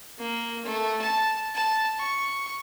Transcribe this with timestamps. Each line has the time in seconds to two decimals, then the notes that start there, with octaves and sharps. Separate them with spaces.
0.18 A#3
0.65 A3
1.01 A5
1.55 A5
1.98 C#6